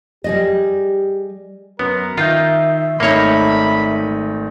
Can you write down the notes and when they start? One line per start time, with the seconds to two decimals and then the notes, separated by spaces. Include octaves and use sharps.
0.24 G3 G4 G#4 D#5
1.79 F#2 B3 A#4
2.17 D#3 D#4 F4 E5 G6
3.00 G#1 A3 A#3 D#4 C#5 B5